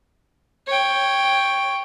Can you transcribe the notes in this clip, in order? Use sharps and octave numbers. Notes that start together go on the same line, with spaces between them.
C#5 G5